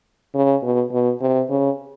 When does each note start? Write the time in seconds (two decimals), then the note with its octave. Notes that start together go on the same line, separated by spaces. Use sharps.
0.35 C#3
0.63 B2
0.92 B2
1.21 C3
1.50 C#3